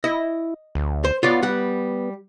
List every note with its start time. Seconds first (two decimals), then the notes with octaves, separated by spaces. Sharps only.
0.04 E4 D#5
0.75 D2
1.04 C5
1.23 B3 F4 C#5 D5
1.43 G3 F#5